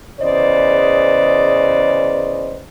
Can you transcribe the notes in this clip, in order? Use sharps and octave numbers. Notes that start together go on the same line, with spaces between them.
E2 C#3 B4 C5 D5 D#5